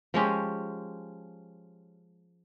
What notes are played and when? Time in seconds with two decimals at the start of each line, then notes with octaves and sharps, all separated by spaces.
0.14 F3 G#3 C#4 G4